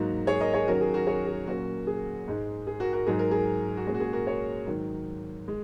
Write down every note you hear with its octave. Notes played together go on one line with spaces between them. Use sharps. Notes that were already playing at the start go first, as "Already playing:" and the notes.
Already playing: G#2 F#3 A#3 D#4 F#4
G#4 C#5
A#4 D#5
G#4 C#5
D#3 F#3 C#4 F#4 A#4
G#4
F#4 A#4
G#4 C#5
G#4
A#2 F#3 A#3 C#4 F#4
G#4
G#2 G#3 D#4
G#4
F#4 A#4
F#4 A#4
G#2 F#3 D#4 G#4
A#4
G#4
F#4
A#2 G#3 C#4 G#4
F#4
G#4
F#4 A#4
G#4 C#5
G#2 D#3 F#3
G#3